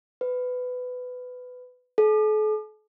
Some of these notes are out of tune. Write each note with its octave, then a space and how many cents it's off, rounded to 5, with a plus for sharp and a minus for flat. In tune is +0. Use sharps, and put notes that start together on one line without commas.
B4 +15
A4 -45